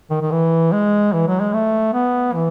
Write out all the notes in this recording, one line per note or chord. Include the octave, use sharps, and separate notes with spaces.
D#3
D#3
E3
G#3
E3
F#3
G#3
A3
B3
E3